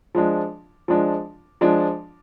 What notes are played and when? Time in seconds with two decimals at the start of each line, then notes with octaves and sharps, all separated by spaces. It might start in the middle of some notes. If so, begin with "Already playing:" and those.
0.15 F3 G#3 D4
0.88 F3 G#3 D4
1.61 F3 G#3 D4